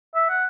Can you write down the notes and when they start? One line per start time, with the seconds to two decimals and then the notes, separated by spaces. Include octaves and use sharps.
0.15 E5
0.29 F#5